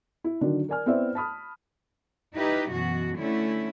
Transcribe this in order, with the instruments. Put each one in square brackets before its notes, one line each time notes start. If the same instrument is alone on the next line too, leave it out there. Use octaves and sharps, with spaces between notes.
[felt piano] E4
D3 D#3 F#3 D4
A#4 D5 G#5 F6
B3 C4 E4 C5 D5 E5
A5 B5 D#6 F6
[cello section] D#4 E4 G4 B4
F#2 B2 E3 F#4
D3 A3 C#4 E4